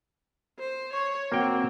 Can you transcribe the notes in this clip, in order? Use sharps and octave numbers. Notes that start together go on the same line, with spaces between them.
C5
C#5 C#6
A#3 C4 F#4 F#5 G5